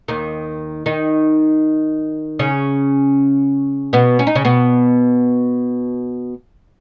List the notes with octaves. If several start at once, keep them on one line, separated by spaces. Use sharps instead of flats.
D#2 D#3
D#3 D#4
C#3 C#4
B2 B3
C#4
D#4
C#3 C#4
B2 B3